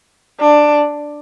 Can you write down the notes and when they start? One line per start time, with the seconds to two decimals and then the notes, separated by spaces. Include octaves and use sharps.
0.40 D4